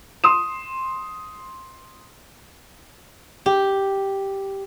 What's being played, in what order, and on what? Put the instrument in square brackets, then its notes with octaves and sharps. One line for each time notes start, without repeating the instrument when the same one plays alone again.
[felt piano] C6 D#6 E7
[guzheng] G4